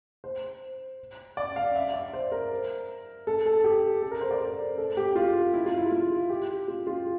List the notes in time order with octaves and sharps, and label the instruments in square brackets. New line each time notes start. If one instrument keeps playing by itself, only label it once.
[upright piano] C5
D5
F5
E5
D5
C5
A#4
A4
A4
G4
A4
A#4
C5
D5
A#4
A4
G4
F4
E4
F4
E4
F4
G4
F4
F4